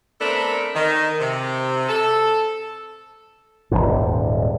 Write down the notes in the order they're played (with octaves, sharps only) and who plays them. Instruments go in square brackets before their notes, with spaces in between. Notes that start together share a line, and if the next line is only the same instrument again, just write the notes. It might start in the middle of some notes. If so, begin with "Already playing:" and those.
[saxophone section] A3 B3 C4 D4 A4 A#4
D#3
C3
A4
[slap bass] D#1 G#1 G#2